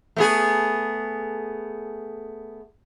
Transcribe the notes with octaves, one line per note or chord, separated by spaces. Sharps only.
A3 B3 G#4